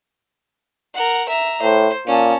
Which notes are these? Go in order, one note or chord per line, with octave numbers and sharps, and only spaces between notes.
A#4 F#5
E5 A#5
A2 C5
A#2 C#4 A5